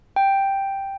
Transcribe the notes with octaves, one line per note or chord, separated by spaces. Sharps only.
G5